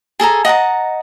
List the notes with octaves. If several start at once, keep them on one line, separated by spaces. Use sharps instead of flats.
G#4 A4 G#5 A#5
D#5 F#5 A5 A#5